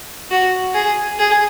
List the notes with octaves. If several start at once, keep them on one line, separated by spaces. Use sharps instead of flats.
F#4
G#4
G#4